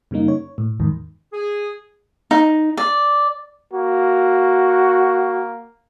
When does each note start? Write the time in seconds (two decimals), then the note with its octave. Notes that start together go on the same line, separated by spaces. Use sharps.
0.11 F#2 C#3 G3 A#3 D#4
0.28 C#5
0.58 A2
0.80 E2 G#2 D#3
1.33 G#4
2.31 D#4
2.77 D5
3.73 A#3 F#4